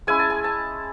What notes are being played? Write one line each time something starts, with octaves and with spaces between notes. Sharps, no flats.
G#3 C#4 E4 G#5
A5
G#5
A5